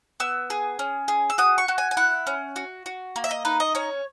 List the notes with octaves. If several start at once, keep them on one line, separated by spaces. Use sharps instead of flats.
B3 E6
G#4
C#4
G#4
E6
F#4 D#6
C#6
F#4
G#5
G#5
E4 F#5
C#4
F#4
F#4
A#3
E5
D#5
D#4 B4
D#5
C#4 C#5